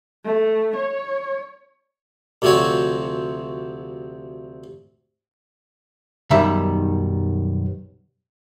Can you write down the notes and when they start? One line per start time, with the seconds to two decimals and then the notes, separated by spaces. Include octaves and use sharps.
0.25 A3
0.76 C#5
2.42 D2 C3 F3 C4 F#4 C#5
6.31 B1 F#2 D#3 G3 E5